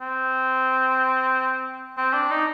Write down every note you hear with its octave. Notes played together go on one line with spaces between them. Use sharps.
C4
C4
D4
D#4